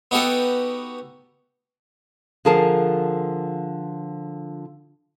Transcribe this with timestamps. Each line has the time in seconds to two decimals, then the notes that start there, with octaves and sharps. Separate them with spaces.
0.11 B3 D#4 F#4 G4 A4
2.45 D3 F3 G#4 A#4 A5